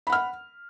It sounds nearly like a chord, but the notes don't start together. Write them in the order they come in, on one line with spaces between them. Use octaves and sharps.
B5 F#5 F6